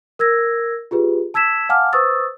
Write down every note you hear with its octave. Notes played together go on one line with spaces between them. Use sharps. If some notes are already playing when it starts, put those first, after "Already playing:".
A#4 E6 G#6 A#6
F4 G4 G#4 B4
A5 E6 G#6 B6 E7
F5 F#5 G#5 A5 D6 F6
B4 C5 C#6 D#6 E6 A6